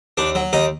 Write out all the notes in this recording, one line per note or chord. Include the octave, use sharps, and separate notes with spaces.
D#2 D4
F#3
D#2 D#4